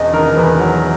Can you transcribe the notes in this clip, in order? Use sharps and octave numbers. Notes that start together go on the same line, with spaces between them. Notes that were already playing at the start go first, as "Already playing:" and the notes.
Already playing: E1 E2 D#5
D#3 A#4
E2 B4
F#3